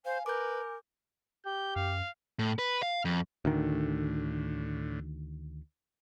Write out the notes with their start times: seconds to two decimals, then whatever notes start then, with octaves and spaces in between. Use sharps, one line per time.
0.05 C5 F5 G#5
0.26 A#4 B4 D6 G6
1.45 G4 G6
1.76 F#2 F5
2.39 A2
2.59 B4
2.83 F5
3.05 F2
3.45 D2 A2 D3 D#3